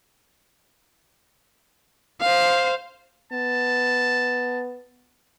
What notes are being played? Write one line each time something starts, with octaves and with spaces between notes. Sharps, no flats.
C5 F5
B3 A5